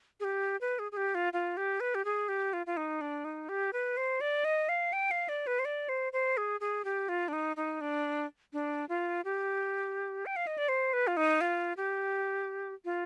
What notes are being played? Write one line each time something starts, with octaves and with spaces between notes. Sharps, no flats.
G#4
G4
B4
G#4
G#4
G4
F4
F4
G4
B4
G4
G#4
G4
F4
F4
D#4
D4
D#4
G4
B4
C5
D5
D#5
F5
G5
F5
D5
B4
C5
D5
C5
C5
G#4
G#4
G4
F4
D4
D#4
D#4
D4
D4
F4
G4
G5
F5
D#5
D5
C5
B4
F4
D#4
F4
G4
F4